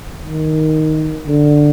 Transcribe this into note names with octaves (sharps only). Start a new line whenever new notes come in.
D#3
D3